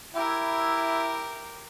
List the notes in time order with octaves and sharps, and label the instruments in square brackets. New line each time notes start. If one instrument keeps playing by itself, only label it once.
[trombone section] E4 [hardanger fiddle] G4 A#4